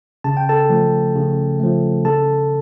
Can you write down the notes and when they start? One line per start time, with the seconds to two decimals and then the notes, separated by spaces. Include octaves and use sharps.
0.24 C#3 A5
0.37 G5
0.49 A4 A5
0.70 F3 A3
1.15 C#3
1.60 F3 A3
2.05 C#3 A4 A5